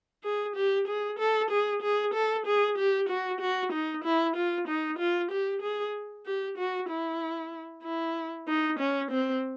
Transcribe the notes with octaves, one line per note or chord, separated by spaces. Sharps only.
G#4
G4
G#4
A4
G#4
G#4
A4
G#4
G4
F#4
F#4
D#4
E4
F4
D#4
F4
G4
G#4
G4
F#4
E4
E4
D#4
C#4
C4